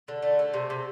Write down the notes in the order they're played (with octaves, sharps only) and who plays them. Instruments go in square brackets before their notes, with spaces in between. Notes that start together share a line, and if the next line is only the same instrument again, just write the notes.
[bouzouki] D3
A3
A3
C3
C3